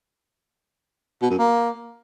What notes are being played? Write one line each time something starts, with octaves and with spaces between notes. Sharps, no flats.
B2
F#2
A#3